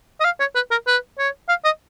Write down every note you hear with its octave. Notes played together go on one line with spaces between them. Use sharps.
D#5
F5
C#5
B4
A#4
B4
C#5
F5
D#5